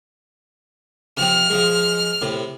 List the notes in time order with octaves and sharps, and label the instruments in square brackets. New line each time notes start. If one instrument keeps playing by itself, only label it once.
[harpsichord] C3 F3 C4 [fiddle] F6
[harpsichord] F3 G#3
A2 C3